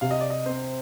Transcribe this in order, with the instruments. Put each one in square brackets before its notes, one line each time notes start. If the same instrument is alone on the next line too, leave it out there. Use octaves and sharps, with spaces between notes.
[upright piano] C3 [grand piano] F5
[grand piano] D#5
D5
D#5
[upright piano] C4 [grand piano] C5